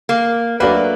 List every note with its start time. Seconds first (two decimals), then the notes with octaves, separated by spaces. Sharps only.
0.09 A#3
0.60 F#3 A3 A#3 D4 F#4 B4